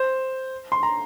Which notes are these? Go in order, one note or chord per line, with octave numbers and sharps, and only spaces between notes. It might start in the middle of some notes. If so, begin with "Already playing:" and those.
Already playing: C5
C6
A#5